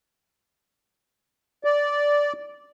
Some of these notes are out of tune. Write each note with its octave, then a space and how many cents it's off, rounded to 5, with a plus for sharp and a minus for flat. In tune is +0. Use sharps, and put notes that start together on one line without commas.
D5 -10